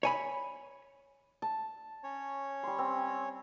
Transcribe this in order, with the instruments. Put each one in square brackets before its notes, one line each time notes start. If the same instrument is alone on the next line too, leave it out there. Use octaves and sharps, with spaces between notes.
[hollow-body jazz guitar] C#5 G#5 B5
[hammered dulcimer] A5
[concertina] C#4 C#5
[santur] G3 C6
C4